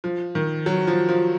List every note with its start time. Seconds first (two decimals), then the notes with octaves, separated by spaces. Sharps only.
0.04 F3
0.35 D#3
0.66 F#3
0.87 F3
1.09 F3